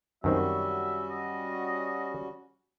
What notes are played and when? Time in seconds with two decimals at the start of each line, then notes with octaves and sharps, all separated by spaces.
0.24 F#2 D#3 G3 C4 C#4 F#4 E5
1.10 D#5